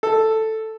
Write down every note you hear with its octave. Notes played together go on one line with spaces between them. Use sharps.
A4